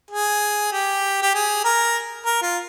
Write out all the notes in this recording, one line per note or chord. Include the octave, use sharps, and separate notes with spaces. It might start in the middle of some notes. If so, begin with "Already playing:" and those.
G#4
G4
G4
G#4
A#4
A#4
F4